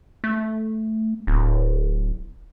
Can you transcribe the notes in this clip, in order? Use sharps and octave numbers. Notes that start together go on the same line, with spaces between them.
A3
D1